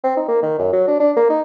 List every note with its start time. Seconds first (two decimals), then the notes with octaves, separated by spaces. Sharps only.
0.04 C4
0.17 D#4
0.28 A#3
0.42 D#3
0.59 F#2
0.73 F#3
0.88 D4
1.00 D4
1.17 A#3
1.30 D#4